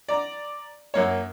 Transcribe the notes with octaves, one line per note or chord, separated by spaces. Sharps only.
D5 A#5
F#2 A#3 C#5